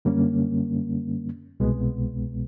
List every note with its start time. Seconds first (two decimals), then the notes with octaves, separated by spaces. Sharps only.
0.05 F#2 D3 G3 A#3 C#4
1.60 C2 B2 G#3 B3